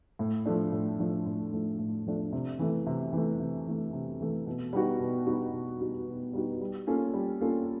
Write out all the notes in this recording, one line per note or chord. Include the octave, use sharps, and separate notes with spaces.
A2
F3 A3 D4
A2
F3 A3 D4
A2
F3 A3 D4
A2
F3 A3 D4
C3
E3 A3
C3
E3 A3
C3
E3 A3
C3
E3 A3
B2
G3 B3 D#4 F#4
B2
G3 B3 D#4 F#4
B2
G3 B3 D#4 F#4
B2
G3 B3 D#4 F#4
G3
A#3 C#4 F4 A4
G3
A#3 C#4 F4 A4